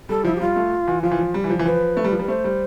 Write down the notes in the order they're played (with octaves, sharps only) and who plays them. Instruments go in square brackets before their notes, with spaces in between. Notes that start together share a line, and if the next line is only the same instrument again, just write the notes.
[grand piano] G3 [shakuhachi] A4
[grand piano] F3 [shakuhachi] E4
[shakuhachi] G4
[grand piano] G3 [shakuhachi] F4
[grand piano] A3
E3
[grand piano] F3 [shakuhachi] F4
[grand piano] E3
F3
G3
E3
F3
E3
[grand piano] F3 [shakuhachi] B4
[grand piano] A3
G3
F3
G3
[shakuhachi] B4
[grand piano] A3 [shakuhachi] C5
[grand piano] G3